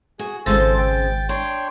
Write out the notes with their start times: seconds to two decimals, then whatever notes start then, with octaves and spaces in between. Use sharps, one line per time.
0.19 F#4 G#4
0.46 G#1 C#3 G#3 C4 A4 C5 A6
0.78 G5
1.29 D4 C#5 G5 C6